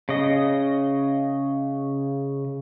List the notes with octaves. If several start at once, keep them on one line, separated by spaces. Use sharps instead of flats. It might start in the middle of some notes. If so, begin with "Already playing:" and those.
C#3 D#5